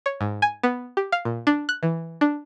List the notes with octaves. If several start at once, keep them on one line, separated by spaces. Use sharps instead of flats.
C#5
G#2
G#5
B3
G4
F5
A#2
D4
F#6
E3
D4